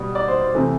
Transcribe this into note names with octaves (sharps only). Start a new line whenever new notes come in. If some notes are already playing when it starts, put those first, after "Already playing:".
Already playing: B2 G3
D5
C5
C5
C3 E3 A3